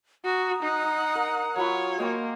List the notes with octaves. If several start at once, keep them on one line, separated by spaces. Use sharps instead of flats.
F#4 A#5 D#6
D#4 F#5
A#4
F#3 F4 C#5 G#5 B5
A#3 D#5 G5 C6